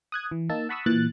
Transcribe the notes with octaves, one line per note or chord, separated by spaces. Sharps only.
D#6 F#6 G#6
E3
A#3 D#4 A5 E6
F#5 A5 B5 C#6 D#6 E6
A#2 E3 F#6 A6